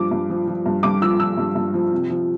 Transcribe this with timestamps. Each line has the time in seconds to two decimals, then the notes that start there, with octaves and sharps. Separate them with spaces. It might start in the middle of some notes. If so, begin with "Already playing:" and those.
Already playing: G2 F3 D6
0.11 G2
0.30 F3
0.47 F3
0.66 G2
0.83 G2 D6
1.01 F3 E6
1.20 F3 E6
1.38 G2
1.55 G2
1.74 F3
1.92 C3
2.10 F3